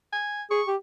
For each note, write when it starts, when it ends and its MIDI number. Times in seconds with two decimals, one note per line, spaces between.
0.13 0.42 80
0.51 0.62 68
0.51 0.69 85
0.67 0.76 67